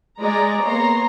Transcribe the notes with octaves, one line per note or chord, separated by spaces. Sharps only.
G#3 D5 A#5
A#3 B3 C#5 A#5 C6